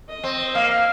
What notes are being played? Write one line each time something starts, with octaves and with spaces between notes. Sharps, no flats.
D#5
C4
A#3 F5